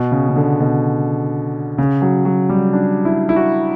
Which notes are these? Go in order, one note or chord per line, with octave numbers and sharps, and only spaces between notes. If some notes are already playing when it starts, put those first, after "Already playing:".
Already playing: B2
C#3
C#3
D3
B2
C#3
F#3
F#3
G3
D4
E4
E4
F#4